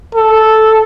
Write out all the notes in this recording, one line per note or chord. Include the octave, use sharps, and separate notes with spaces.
A4